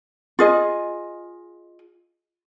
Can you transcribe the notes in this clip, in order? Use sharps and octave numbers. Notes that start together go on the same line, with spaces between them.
F4 G#4 D#5